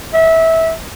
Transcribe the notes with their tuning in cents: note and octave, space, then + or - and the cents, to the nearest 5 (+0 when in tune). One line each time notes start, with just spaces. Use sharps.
E5 -20